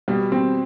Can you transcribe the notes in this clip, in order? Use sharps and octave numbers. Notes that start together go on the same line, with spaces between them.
B2 G3
C4